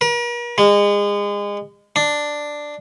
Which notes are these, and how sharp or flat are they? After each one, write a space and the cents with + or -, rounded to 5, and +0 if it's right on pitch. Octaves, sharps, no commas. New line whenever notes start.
A#4 +45
G#3 -30
D4 +5